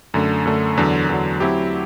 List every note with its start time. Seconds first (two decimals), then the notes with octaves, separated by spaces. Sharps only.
0.14 F#2 D3 A3
0.45 F#2 D3 A3
0.77 E2 D3 F#3
1.09 E2 D3 F#3
1.40 F#3 C4 E4 G4